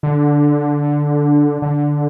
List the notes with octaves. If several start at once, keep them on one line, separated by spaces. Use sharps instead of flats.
D3
D3